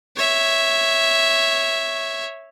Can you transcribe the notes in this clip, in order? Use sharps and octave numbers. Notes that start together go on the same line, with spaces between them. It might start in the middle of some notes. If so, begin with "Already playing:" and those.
C#5 E5